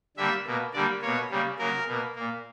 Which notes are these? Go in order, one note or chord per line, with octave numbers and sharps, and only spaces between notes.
D3 G3 A#3 E5
B2 A#3
D3 G3 A#3 D5
B2 A#3 C#5
C#3 G3 A#3
C#3 F#3 A#3 A#4
B2 A#3
A#2 A#3